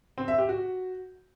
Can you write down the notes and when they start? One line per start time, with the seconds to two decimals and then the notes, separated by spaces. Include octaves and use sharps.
0.18 C4
0.28 E5
0.38 G4
0.49 F#4